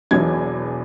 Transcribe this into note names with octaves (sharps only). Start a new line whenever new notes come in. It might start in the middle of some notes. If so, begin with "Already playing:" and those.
E1 E2 B2 F#3 G#6